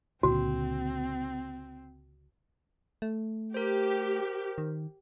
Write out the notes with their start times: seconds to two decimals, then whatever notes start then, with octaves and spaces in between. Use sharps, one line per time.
0.23 C#2 A#2 D3 C4 F#4
3.02 A3
3.54 G4 A#4 C5
4.58 D#3